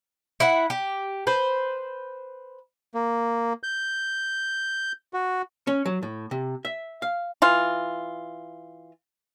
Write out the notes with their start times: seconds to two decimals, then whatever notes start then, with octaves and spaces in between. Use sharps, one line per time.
0.40 E4 F#5
0.70 G4
1.27 B4 C5
2.95 A#3
3.63 G6
5.14 F#4
5.67 C#4
5.86 F#3
6.03 A2
6.31 C3
6.65 E5
7.02 F5
7.42 E3 F4